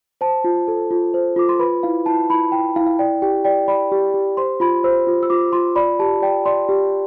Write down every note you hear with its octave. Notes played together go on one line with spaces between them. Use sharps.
C5 A5
F4
A4
F4
C5
F4 D6
C6
B4 B5
E4 F5
E4 A5
E4 B5
E4 G5
E4 F5
F5
D5 G5
G4 G5
D5 G5
D5 B5
G4
G4
C5 C6
F4 B5
C5 E6
F4
E6
F4 D6
F4 C6
D5 B5
G4 A5
D5 G5
D5 C6
G4